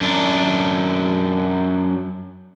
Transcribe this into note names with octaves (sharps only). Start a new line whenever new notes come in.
F#2 D4